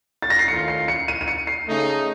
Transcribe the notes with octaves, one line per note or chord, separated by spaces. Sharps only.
A6
A#6
C7
D#3 A3 C#4 F4 C#7
C7
C#7
D#7
D#7
C#7
C7
C#3 A3 D#4